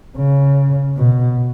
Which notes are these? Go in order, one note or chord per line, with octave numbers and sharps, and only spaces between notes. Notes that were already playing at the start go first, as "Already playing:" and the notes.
C#3
B2